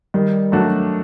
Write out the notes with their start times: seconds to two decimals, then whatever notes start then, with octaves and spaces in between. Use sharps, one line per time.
0.14 D#3 G3
0.52 F#3 A3 D4 F#4